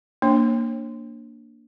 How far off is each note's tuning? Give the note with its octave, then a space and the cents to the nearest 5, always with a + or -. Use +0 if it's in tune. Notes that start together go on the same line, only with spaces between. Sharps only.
A#3 +0 D4 +0 C#5 -35